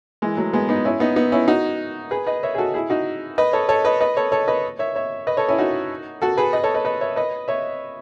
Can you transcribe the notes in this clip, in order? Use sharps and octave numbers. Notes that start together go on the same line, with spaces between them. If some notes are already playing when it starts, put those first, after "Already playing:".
E3 G#3
F#3 A3
G#3 B3
B3 D#4
C#4 E4
B3 D#4
B3 D#4
C#4 E4
D#4 F#4
G#4 B4
B4 D#5
C#5 E5
G#4
F#4 A4
E4 G#4
D#4 F#4
B4 D#5
A4 C#5
A4 C#5
B4 D#5
B4 D#5
A4 C#5
A4 C#5
B4 D#5
C#5 E5
C#5 E5
B4 D#5
A4 C#5
C#4 E4
D#4 F#4
F#4 A4
G#4 B4
B4 D#5
A4 C#5
B4 D#5
B4 D#5
C#5 E5
B4 D#5
C#5 E5